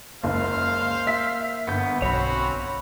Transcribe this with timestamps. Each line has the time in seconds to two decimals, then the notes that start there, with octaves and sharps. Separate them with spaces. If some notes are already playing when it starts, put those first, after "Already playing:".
0.24 F#1 C#2 A#3 C5 F5
1.07 E5 B6
1.67 G1 B3 G6
2.02 B1 C4 C#4 F#4 C#5 B5